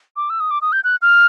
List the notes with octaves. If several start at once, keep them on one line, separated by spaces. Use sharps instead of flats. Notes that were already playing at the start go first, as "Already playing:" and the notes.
D6
E6
D#6
D6
D#6
G6
F#6
F6